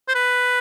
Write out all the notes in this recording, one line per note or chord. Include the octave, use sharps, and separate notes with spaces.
C5
B4